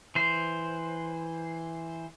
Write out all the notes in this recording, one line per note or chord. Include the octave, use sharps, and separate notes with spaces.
E3 C5